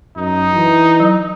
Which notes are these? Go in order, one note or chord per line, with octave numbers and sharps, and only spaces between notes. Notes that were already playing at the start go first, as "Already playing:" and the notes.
F#2 D#4
E3
F#3